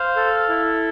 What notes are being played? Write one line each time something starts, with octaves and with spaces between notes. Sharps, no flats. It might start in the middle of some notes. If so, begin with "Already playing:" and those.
Already playing: C5 F5
A4
E4